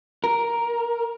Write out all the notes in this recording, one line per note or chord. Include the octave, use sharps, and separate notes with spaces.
A#4